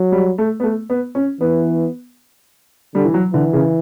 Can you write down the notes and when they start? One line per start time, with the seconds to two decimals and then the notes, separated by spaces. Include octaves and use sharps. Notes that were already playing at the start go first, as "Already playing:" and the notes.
Already playing: F#3
0.12 G3
0.38 A3
0.60 B3
0.63 A3
0.90 B3
1.15 C#4
1.41 E3 B3
2.95 D3 G3
3.05 E3
3.14 F#3
3.33 D3 E3
3.53 C#3